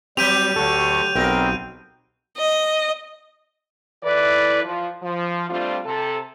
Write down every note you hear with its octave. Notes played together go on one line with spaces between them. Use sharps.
F#3 G3 C4 G4 G6 D#7 F7
D2 D3 A4 C#6
B1 B2 C4 A#4 G5
D#5
E3 E4 A4 B4 D5
F3
F3
G3 A3 C4 D4 F4
C3 A4